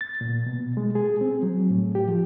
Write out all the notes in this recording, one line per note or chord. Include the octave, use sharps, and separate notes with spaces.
A6
A#2
B2
G#3
G#4
C4
F#3
A2
G4
F3